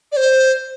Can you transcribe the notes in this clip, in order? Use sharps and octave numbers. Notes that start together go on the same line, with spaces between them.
D5
C5